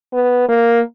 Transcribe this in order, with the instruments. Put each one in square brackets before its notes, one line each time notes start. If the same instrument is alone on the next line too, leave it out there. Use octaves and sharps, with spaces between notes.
[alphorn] B3
A#3